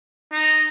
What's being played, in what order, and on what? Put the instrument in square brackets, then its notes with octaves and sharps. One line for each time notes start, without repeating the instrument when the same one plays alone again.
[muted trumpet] D#4